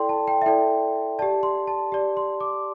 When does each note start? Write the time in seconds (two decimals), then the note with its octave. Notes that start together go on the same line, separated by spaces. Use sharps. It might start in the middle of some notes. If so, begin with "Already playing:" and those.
Already playing: E4 A4 D5 G5 C6
0.09 A5
0.28 G5
0.42 E5
0.46 E4 A4 D5 G5
1.19 G4 D5 A5
1.43 C6
1.67 A5
1.92 G4 D5
2.17 C6
2.41 D6